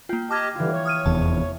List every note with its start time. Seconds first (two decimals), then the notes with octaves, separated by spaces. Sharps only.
0.09 A#3 F4 G5
0.31 G4 D#5 A5 D6 F6 G#6
0.55 G2 D3 E3 F4
0.71 C#5
0.86 D#6 F6 D#7
1.06 F1 E2 A5